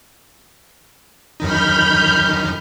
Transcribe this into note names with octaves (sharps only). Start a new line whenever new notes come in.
F#2 D#3 D#4 B5 F6 G6